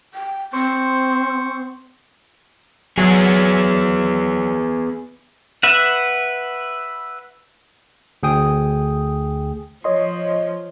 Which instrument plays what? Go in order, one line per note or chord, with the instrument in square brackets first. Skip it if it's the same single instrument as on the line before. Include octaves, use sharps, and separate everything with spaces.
[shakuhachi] G5
[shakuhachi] C4 [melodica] C5 C#6
[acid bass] F#3 [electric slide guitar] B3 G#4
[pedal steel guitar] B4 E5 F#5
[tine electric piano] D2 G#4 G5 D#6
[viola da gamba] F3 [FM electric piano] C#5 D#5 C6